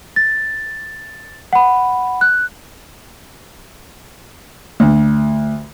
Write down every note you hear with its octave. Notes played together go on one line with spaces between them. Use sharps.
A6
F#5 B5
F#6
D2